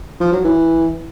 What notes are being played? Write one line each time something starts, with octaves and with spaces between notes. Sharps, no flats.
F3
F#3
E3